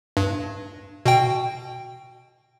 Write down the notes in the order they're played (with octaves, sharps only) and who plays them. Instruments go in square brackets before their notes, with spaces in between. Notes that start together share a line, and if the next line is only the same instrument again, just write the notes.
[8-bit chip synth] G2
B2 G5